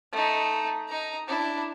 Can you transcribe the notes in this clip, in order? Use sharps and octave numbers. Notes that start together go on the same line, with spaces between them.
A3 D#4
D#4 A#5
D4 E4